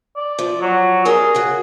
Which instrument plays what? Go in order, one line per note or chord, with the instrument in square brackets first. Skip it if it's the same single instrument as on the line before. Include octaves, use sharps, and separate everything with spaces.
[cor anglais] D5
[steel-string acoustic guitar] F3
[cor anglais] F#3
[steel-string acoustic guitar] G4 A#4 D5 [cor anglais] G#4
[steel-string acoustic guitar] C#3 F#4